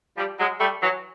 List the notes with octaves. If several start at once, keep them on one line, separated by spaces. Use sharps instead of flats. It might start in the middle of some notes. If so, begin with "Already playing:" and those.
F3 G3
F#3 G#3
G3 A3
E3 F#3